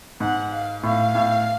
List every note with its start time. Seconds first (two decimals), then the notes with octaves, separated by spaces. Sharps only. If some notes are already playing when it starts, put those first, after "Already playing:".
0.20 G#2 F#5
0.52 F5
0.83 A2 F5
1.15 A2